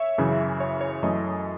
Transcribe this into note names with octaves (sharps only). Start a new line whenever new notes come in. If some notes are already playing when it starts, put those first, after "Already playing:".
Already playing: C#5 E5
F#2 C#3 E3
C#5
C#5
F#2 E3 A3 D#5